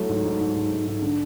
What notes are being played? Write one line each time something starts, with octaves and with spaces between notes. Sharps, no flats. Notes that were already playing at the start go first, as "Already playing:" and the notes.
Already playing: F#3 A3 E4
G#2
G#2
G#2
G#2
G#2
G#2
D3